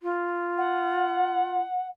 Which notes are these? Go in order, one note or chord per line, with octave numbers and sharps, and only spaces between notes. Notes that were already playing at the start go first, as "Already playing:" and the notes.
F4
F#5